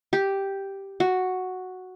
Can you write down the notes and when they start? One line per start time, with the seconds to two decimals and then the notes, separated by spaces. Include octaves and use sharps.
0.13 G4
1.00 F#4